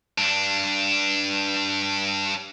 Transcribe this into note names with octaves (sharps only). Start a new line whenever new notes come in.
G2 D4